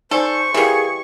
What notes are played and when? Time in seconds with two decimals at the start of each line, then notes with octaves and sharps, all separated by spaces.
0.11 D#4 A4 C5 D5 G#5 C#6
0.54 E3 G3 G4 G#4 A#4 F5